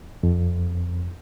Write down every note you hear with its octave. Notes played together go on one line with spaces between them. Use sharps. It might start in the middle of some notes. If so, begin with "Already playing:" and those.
F2